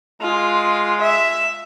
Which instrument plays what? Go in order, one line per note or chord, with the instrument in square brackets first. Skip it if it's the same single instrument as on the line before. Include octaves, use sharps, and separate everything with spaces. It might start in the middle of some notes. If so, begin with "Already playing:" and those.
[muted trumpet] G#3 [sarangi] F4
[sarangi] E5